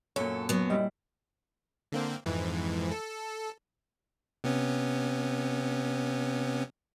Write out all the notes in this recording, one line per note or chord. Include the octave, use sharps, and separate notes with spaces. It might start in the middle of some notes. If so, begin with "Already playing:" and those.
F#2 A#2 A4 C#5
F#3 B3
G3 E4 D#5
D3 A#3 C4
F2 G#2 E3
A4
C3 B3 C#4